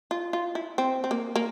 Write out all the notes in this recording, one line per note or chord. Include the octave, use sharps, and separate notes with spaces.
F4
F4
E4
C4
C4
A#3
A#3